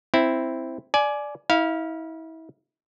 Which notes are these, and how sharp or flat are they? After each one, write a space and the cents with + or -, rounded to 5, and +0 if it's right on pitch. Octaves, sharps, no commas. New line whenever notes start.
C4 +0 E4 +0
D5 +0 G#5 +25
E4 -35 F5 -5